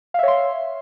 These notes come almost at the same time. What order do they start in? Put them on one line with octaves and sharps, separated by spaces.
F5 E5 C#5 C6